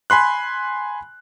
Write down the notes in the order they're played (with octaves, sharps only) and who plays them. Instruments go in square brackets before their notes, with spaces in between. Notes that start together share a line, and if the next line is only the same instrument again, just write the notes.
[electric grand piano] G#5 B5 C6 F#6